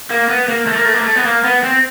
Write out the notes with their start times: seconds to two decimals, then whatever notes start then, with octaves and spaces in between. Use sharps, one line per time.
0.10 A#3
0.29 B3
0.48 A#3
0.67 A3
0.76 A#3
0.85 A3
0.94 A#3
1.03 A3
1.16 B3
1.25 A#3
1.44 B3
1.64 C4